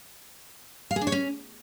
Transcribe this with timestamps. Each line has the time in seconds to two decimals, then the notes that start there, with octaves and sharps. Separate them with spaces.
0.91 F5
0.96 G#4
1.01 D4
1.07 C#5
1.12 C#4